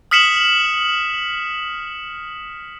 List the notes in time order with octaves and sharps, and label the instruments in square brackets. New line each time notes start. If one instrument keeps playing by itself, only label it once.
[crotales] D#6 F6 B6 C#7 E7 F#7